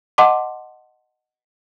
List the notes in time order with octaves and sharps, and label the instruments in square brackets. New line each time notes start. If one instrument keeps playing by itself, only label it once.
[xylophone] D#5 F#5 A5 C6 D6